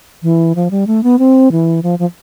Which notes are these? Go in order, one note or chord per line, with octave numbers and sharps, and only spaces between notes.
E3
F3
G3
A3
B3
C4
E3
F3
F3